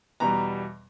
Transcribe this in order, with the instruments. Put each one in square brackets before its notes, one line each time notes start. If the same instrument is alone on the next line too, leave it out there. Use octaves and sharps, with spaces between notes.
[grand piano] E2 B2 G3 A#5